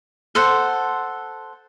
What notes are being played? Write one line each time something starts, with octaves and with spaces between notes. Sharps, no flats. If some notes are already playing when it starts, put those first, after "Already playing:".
A4 C5 F#5